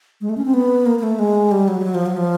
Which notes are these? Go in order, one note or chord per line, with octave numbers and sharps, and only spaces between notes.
G#3
A3
C#4
C4
B3
A#3
A#3
A3
G#3
G3
F#3
G3
F#3
F3
F#3
F3